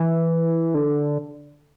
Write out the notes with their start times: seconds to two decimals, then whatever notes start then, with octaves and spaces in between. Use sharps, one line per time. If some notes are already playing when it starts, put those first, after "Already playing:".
Already playing: E3
0.74 D3